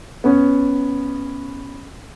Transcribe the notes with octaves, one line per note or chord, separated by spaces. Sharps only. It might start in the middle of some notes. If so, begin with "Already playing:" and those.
B3 C#4